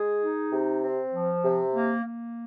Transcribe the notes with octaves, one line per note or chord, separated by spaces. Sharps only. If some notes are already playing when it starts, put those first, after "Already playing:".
Already playing: G#3 G#4
D#4
C3
C4
F3
C3
A#3
A#3